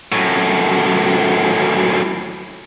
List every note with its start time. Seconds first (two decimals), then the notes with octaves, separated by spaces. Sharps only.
0.12 F#2 A2